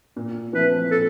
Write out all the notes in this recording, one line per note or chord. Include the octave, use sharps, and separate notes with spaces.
A#2
F3 A3 C4 E4 B4
A#2 A4